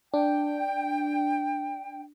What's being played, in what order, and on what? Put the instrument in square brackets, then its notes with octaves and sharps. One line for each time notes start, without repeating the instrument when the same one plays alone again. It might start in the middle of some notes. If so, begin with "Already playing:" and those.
[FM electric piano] D4 [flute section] G5